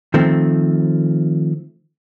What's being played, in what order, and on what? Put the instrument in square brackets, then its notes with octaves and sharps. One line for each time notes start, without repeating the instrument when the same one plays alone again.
[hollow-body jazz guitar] D#3 F3 A3 C4